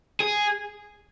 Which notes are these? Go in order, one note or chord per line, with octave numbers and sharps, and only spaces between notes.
G#4